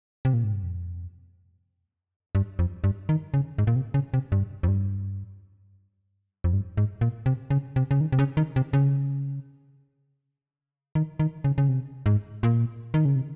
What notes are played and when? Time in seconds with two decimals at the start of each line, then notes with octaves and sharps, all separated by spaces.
0.25 C3
0.34 A#2
0.44 G#2
0.54 G2
0.63 F2
2.35 G2
2.59 F2
2.84 G2
3.09 D#3
3.34 C#3
3.58 G#2
3.67 A#2
3.76 C3
3.94 C#3
4.14 C3
4.32 G2
4.63 F2
4.68 G2
6.44 F2
6.53 G2
6.77 G#2
7.01 A#2
7.26 C3
7.50 C#3
7.76 C3
7.91 C#3
8.01 D#3
8.12 C3
8.19 C#3
8.37 D#3
8.56 C3
8.73 C#3
10.95 D#3
11.19 D#3
11.44 C#3
11.58 C#3
11.69 C3
12.06 G#2
12.43 A#2
12.94 D#3
13.05 C#3
13.16 C3